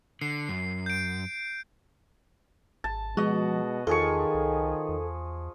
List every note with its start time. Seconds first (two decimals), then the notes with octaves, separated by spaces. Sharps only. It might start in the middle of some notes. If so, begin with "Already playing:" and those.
0.22 D3 C7
0.49 F#2
0.86 G6 D7
2.84 G#1 A5
3.17 B2 F3 G#3 F#4 D#5
3.87 E2 D#3 F3 G#4 A4 C#6
4.34 C2
4.89 E2